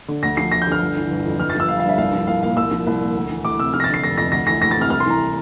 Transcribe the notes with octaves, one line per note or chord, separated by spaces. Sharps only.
D3
D2 A#6
F3 C7
D2 A#6
G6
D3 F6
G1
E3
G1
F2
G1 F6
A6
F3 E6
G1 F5
F5
G2 E5
C2 F5
F3
C2 F5
A#2 F5
C2 E6
F3
C2
A#2
D2
E3
D2 D6
C3 E6
F3 F6
A#6
A6
D3
C7
F1 A#6
F2 A#6
D2 A#6
E3 A#6
D2 A#6
A6
C3 F6
C2 F6
C6
E3 A#5